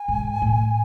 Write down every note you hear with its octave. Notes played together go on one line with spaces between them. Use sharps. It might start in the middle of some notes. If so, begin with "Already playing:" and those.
Already playing: G#5
G#2
A2